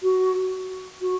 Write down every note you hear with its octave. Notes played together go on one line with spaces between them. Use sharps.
F#4
F#4